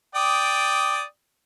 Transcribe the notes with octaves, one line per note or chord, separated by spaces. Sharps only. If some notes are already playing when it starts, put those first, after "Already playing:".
D5 G5 D#6